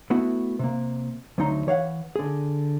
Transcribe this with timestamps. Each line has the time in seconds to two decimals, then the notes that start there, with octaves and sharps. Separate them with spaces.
0.10 A3 B3 E4 F#4
0.59 C3 A#3
1.38 D2 F#3 A3 D#4 A#5 C6
1.67 E3 C#5 F5 F#5
2.16 D3 G#4